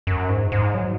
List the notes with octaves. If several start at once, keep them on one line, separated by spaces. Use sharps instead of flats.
F#2
G#2
G#2
F#3